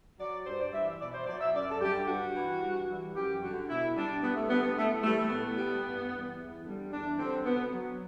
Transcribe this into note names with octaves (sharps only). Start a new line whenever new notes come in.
F#3 D5
G2 C5
D5
E3 G3 E5
E5
B2 D5
C5
F#3 D5
E5
F#2 D5
A4
D3 G3 G4
G2 F#4
E3 G3
G2
E3 G3
F#2 G4
D3 G3 F#4
B2 E4
G3 D4
G2 B3
A3
D3 G3 B3
B3
A2 A3
E3 G3 A3
A3
A2 B3
G3
G2
E3 G3
E2
D3 G3
E2 D4
D3 G3 C4
B2 B3
F#3